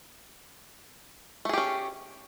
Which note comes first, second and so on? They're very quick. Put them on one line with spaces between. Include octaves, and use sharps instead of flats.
A3 G#4 G4 C#4